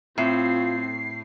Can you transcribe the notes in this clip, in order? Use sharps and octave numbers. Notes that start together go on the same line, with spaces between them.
A2 C4 F4 C7